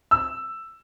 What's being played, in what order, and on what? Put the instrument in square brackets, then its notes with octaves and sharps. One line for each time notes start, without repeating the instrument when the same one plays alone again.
[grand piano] E6